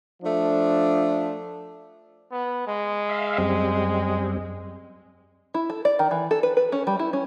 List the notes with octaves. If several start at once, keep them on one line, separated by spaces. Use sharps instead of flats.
F3 A3 D4
B3
G#3
E5 F5
F#2 G3 C4
E4
A4
D5
D#3
E3
A4
B4
B4
C#4
G3
E4
C#4